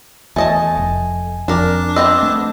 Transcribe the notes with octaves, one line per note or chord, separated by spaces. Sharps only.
E2 A3 D#5 G#5 A5
F1
F2 D4 A#4 D5 D6
B3 C4 D#5 E6
A3